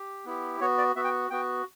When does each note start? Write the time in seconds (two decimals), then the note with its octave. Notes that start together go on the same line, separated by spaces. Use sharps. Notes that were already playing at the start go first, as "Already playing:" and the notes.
Already playing: G4
0.25 B3 E4 G4
0.60 B3 F#4 C#5
0.78 D5
0.96 B3 F#4 E5
1.04 G5
1.30 B3 F#4 G5